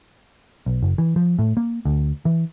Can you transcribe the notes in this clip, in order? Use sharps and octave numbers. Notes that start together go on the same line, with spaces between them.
B1
F#1
E3
F3
A2
A#3
D2
E3